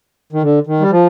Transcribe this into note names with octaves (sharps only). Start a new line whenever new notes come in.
D#3
D3
D#3
G3
F3